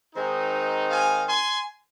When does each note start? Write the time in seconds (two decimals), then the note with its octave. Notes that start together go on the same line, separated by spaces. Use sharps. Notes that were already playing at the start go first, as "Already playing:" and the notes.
0.16 D#3 G#3 C4 D#4
0.90 F5 G#5
1.27 G#5 C6